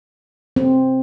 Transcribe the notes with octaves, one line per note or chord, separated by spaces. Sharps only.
C4